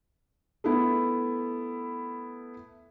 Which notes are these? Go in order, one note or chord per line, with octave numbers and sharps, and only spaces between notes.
A3 B3 E4